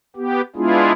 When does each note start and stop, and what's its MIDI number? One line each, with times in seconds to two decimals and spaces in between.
0.16 0.41 59
0.16 0.41 67
0.56 0.92 56
0.56 0.92 59
0.56 0.92 62
0.56 0.92 64
0.56 0.92 65
0.56 0.92 68